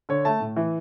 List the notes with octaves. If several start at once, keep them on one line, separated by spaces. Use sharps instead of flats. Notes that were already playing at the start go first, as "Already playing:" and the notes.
D3 C#5
A3 A5
A2
E3